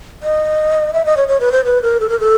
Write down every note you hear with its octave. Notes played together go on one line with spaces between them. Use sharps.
D#5
E5
D#5
C#5
C#5
B4
C5
B4
A#4
A4
A#4
A4